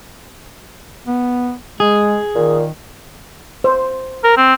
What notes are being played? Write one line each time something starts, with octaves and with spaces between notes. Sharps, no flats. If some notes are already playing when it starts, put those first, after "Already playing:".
B3
G#3 G#4
A#2 D#3
C5
A#4
C4